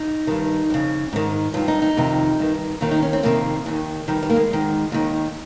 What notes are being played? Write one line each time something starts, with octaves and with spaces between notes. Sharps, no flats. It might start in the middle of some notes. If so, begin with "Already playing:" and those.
Already playing: D#4
G2 D#3
F2 C#3
G#2 D#3
G2 D#3 F4
D#4
D#4
F2 C3 D#3
G2 D#3
D#2 D#3 F4
D#4
C#4
C4
F2 C3 D#3 A#3
D#2 D#3
G2 D#3 G3
G3
A#3
G#3
G#2 D#3
D#2 D#3